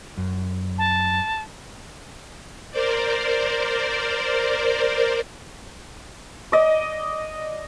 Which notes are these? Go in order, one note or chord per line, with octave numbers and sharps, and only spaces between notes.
F#2
A5
A#4 C5 D5
D5 D#5